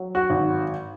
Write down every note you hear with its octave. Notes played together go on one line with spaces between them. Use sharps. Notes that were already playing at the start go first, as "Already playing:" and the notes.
Already playing: F#3
F#4
G#1